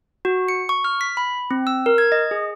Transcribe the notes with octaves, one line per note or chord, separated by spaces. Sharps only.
F#4
C#7
C#6
F6
B6
B5
C4
E6
A#4
G#6
D#5
G#4